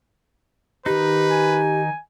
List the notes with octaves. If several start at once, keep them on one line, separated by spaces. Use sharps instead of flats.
D#3 D#4 G4 B4
G#5